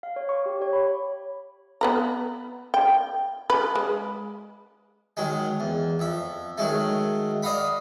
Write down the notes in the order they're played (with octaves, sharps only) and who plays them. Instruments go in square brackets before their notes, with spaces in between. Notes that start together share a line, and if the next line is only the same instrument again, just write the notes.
[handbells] F5
C#5
C#6
G4
C#5
B5
[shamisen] B3 B4 A#5
G5
B4
G#3
[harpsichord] D#3 F#3 G#3
E2
F2 E5
D#3 F#3 G#3 A3
D5 D#5 F5 F#5 B5